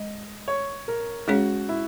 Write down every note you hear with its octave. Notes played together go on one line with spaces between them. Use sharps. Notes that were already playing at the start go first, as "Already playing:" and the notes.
Already playing: G#3 D#5
C#5
A#4
G#3 C#4 F#4 G#4 C#5
E4